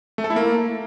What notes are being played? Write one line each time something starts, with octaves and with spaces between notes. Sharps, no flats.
A3
A4
E4
A#3